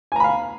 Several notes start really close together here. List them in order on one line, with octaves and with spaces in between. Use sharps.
G#5 A#5 B5 F5